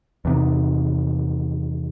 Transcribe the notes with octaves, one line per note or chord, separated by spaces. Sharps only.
E2 C3 D#3